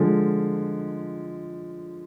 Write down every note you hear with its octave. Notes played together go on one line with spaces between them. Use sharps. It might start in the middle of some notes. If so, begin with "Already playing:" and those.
Already playing: D3 F3 G#3